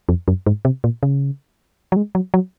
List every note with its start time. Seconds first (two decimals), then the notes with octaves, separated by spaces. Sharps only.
0.09 F2
0.28 F#2
0.46 G#2
0.65 C3
0.84 A#2
1.03 C#3
1.92 F#3
1.96 G#3
2.15 F#3
2.34 F#3